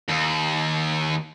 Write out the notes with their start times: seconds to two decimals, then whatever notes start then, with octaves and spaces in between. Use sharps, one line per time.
0.09 D#2